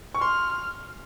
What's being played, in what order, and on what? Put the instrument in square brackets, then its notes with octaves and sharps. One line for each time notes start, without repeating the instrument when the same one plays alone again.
[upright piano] C#6
[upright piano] C6 [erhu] F6